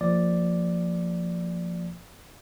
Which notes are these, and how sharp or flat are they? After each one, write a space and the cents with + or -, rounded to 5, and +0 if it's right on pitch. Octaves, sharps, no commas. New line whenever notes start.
F3 +0 A#3 -25 D5 +0